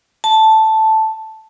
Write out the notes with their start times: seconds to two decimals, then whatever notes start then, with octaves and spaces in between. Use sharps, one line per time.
0.24 A5